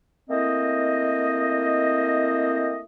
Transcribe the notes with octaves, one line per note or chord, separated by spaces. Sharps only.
A3 A#3 C4 E4 D#5